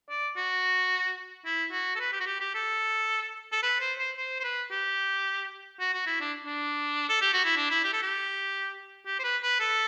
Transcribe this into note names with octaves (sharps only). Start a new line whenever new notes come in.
D5
F#4
E4
F#4
A4
B4
G4
F#4
G4
G4
A4
A4
B4
C5
C5
C5
C5
B4
G4
F#4
F#4
E4
D4
D4
A4
G4
F#4
E4
D4
E4
G4
A4
G4
G4
C5
B4
B4
A4